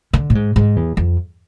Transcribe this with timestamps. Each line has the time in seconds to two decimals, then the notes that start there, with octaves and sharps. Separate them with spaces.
0.13 D3
0.30 A2
0.35 G#2
0.56 G#2
0.76 E2
0.97 F2